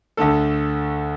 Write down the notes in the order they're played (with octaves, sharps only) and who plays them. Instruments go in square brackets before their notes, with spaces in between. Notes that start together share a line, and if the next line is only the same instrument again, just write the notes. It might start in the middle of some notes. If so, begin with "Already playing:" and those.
[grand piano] D2 D3 A3 A4